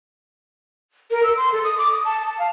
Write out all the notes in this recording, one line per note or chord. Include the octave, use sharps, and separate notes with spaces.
A#4
E6
C6
A4
D#6
D6
D#6
A5
A5
F5